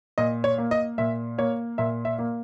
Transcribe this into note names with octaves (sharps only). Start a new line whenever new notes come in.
A#2 D#5
C#5
A#3
D#5
A#2 E5
A#3 C#5
A#2 E5
E5
A#3